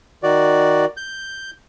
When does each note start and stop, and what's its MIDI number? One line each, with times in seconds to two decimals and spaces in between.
0.23 0.85 51
0.23 0.85 66
0.23 0.85 74
0.97 1.51 91